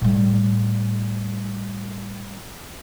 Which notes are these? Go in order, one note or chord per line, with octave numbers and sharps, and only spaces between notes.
A2 G3